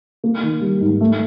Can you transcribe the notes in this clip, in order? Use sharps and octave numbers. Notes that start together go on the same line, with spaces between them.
A#3
D#3
G3
G#2
A3